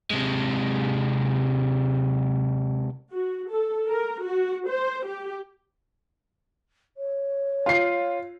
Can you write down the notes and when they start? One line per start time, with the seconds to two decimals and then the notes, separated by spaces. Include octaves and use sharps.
0.10 C3 G#3
3.13 F#4
3.51 A4
3.89 A#4
4.23 F#4
4.70 C5
5.08 G4
6.97 C#5
7.66 F4 C7